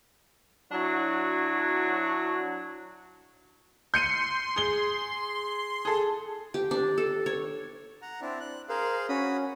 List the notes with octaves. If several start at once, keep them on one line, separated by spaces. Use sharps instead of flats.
F#3 D4 E4 F#4
C6 G6 C#7 D#7
G#4 G7
G#4 A4
G4
D4
A4
C#5
F#5 A#5
C4 D4 E4
F#6
G#4 A#4 C5 F5
C#4 F#4 B5 D#6